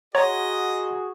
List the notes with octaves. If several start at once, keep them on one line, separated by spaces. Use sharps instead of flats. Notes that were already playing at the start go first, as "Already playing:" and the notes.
F#4 G#4 C#5 D#5 F#5 A#5 C6